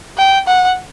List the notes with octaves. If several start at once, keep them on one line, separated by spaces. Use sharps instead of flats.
G5
F#5